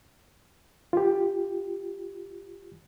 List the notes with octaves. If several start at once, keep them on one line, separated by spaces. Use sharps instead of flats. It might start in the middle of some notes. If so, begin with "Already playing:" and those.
F4 G4